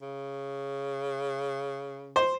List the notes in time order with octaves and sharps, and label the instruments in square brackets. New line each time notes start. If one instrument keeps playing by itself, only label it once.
[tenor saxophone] C#3
[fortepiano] C5